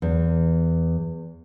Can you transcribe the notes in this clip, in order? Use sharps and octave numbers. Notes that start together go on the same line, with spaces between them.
E2